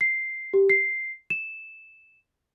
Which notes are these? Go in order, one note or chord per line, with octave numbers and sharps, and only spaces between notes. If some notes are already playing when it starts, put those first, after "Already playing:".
C7
G4
C7
E7